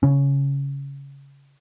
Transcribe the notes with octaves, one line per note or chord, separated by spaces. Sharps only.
C#3 C#4